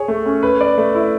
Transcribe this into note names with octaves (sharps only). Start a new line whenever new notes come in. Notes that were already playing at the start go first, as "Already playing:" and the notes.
Already playing: G#4 C#5
A3
C#4
B4
D5
A3
E4